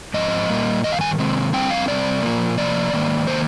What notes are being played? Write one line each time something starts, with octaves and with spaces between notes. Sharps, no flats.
G#2 F3 C4 D#5
A#2 G3 A#3
G2 D#3 D#5
F5
G#5
C3 D#3 G#3 C4
F2 D3 G3 C4 G5
F5
C3 G3 C4 D5
A#2 F3 A#3
C3 F3 A#3 D5
G#2 D#3 A#3
D#3 A#3 C5